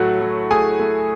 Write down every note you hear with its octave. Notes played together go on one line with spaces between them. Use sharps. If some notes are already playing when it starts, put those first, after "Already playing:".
Already playing: A2 F#3 A3 F#4 F#5
F#3
A3 G#4 G#5
A3